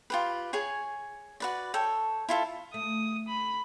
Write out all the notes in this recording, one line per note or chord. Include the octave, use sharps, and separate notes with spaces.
F4 G4 B4
G#4 C#5 G#5
F#4 B4 D5
A4 C#5 G5
E4 F4 A4
A3 D#6
B5